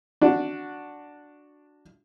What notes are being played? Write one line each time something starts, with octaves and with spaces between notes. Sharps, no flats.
D4 F#4